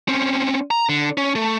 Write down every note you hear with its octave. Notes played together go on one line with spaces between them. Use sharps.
C4 C#4
A#5
D3
C#4
A3